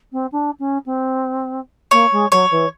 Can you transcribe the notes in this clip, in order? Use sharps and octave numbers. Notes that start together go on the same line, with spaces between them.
C4
D4
C#4
C4
A#3 C#5
G#3
F#3 C#5
E3